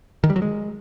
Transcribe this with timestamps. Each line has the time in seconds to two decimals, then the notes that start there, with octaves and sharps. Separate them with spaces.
0.24 D#3
0.30 G3
0.36 F#3
0.42 G#3